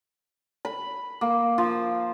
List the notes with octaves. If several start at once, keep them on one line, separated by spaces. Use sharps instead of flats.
B5
A#3
F3